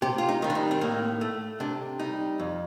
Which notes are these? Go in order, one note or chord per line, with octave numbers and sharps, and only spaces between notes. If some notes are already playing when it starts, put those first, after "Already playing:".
C3 G4
F4
D#4
D#3 G3
D4
D#4
C4
A2 A#3
A3
C3 D4
G3 D#4
F2